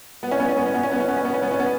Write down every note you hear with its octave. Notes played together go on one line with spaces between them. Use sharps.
B3
C#4
B3
C#4
B3
C#4
B3
C#4
B3
C#4
B3
C#4
B3
C#4
B3
C#4
B3